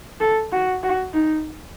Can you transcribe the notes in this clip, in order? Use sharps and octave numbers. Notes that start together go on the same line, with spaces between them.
A4
F#4
F#4
D#4